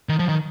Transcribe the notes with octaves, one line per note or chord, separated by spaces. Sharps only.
D#3
F3
D#3